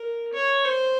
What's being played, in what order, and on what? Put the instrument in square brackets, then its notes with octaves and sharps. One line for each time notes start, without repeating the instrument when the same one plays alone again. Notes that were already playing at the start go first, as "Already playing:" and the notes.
Already playing: [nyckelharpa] A#4
C#5
C5